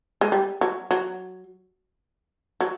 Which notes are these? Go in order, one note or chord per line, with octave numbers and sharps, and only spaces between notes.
G#3
G3
F#3
F#3
F#3